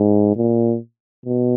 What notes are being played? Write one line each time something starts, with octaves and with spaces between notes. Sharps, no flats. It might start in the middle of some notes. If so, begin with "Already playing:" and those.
Already playing: G#2
A#2
B2